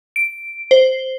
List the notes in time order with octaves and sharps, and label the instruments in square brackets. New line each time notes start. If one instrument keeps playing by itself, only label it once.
[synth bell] D7
C5